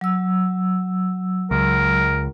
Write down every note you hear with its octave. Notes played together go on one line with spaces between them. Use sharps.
F#3 E6
C#2 A#4